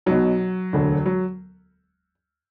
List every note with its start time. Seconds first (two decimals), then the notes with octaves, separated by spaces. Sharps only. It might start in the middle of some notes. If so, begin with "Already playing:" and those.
0.06 B1 B2 F#3
0.73 E1 D2 D3
1.06 F#3